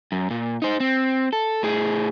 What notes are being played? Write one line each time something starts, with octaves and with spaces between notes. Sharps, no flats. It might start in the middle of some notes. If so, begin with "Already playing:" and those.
F#2
A#2
D#4 C5
C4
A4
A2 G#4